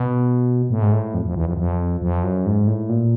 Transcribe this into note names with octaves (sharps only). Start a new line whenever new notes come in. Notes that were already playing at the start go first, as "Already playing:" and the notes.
Already playing: B2
A2
G#2
A2
F2
F2
E2
F2
F2
F2
F#2
G#2
A2
A#2